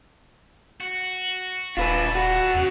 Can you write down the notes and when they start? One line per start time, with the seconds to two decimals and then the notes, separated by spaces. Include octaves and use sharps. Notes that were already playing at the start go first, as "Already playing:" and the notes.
0.81 F#4
1.77 D#1 D4 F4 A4 B4
2.15 F#4
2.55 E2 C#3